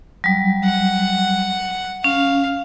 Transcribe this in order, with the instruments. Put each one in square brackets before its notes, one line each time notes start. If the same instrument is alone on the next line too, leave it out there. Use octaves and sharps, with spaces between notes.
[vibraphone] F#3 G3
[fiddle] F#5
[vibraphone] C#4 [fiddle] F5